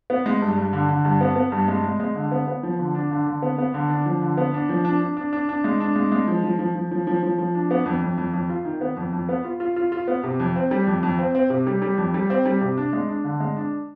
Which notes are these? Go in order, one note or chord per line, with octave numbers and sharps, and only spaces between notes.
B3
G#3
G2
G2
D3
D3
G2
B3
B3
G2
G#3
G#3
G#3
D3
B3
B3
F3
D3
D4
D3
D3
B3
B3
D3
D4
F3
D3
B3
D4
F3
D4
D4
D4
D4
D4
G#3
D4
G#3
G#3
F3
F3
F3
F3
F3
F3
F3
F3
D4
B3
F2
F2
F2
F2
F4
D#3
B3
F2
F2
B3
F4
F4
F4
F4
B3
C3
F2
C4
G3
F2
F2
C4
C4
C3
G3
G3
F2
G3
C4
G3
C3
D4
G#3
D4
D3
G#3
D4